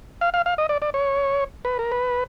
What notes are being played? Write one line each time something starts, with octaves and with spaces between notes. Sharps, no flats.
F5
F5
F5
D#5
D5
D5
C#5
B4
A#4
B4